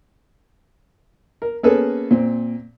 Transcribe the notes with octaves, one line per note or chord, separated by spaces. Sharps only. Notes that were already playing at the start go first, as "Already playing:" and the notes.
A#4
A#3 B3 C#4 G#4 A4 B4
A#2 C4